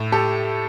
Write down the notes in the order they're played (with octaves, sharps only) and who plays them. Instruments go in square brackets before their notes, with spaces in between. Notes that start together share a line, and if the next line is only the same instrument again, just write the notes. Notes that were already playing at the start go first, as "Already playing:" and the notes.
Already playing: [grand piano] A2
G4 A4